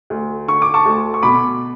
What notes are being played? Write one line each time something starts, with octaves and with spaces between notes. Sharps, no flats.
D2
D3 C#6
D6
A5 C#6
D2
C#6
B2 B5 D6